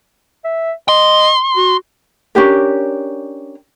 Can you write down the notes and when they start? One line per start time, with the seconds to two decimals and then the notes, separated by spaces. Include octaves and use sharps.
0.45 E5
0.89 D#5 C6
1.57 F#4
2.35 C#4 D4 G4 A#4